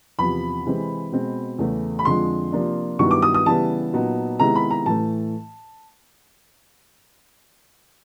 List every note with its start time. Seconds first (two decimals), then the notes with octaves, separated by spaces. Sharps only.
0.19 E2 C3 F3 B5
0.65 C3 E3 G#3 C4
1.12 B2 G#3 C4
1.59 E2 C#3 E3 A3
1.99 B5
2.05 F2 D3 F3 G#3 C6
2.52 C3 F3 A#3 D4
2.99 G2 D#3 F#3 B3 E4 C#6
3.11 D6
3.22 D#6
3.34 D#6
3.46 C#3 E3 G3 B3 E4 A5
3.93 A#2 F#3 B3 D#4
4.39 C3 D#3 G#3 B3 E4 A#5
4.56 B5
4.71 A#5
4.86 A2 E3 A3 A5